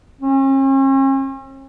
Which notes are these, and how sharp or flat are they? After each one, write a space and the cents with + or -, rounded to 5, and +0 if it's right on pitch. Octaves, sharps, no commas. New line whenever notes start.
C#4 -45